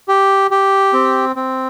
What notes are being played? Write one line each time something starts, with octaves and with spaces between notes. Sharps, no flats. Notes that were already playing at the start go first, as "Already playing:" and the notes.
G4
G4
C4
C4